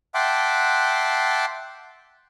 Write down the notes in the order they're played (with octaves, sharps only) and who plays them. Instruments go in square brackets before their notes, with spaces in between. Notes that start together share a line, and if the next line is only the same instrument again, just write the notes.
[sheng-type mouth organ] E5 F#5 G5 A5 C6 D6